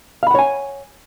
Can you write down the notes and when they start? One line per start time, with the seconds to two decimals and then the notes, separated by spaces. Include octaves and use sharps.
0.23 F5
0.27 B5
0.31 F#5
0.35 C#5
0.39 G#5